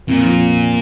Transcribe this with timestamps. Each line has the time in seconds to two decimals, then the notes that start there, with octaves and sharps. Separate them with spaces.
0.07 F2 A#2
0.25 F3